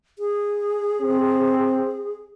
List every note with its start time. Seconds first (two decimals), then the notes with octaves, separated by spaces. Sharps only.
0.19 G#4
1.02 C4